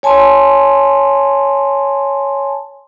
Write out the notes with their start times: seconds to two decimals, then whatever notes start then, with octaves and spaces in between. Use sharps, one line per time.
0.03 C#5 G#5 A5 C6